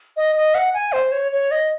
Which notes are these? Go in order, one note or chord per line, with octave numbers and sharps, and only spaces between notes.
D#5
D#5
F#5
G#5
C5
C#5
C#5
D#5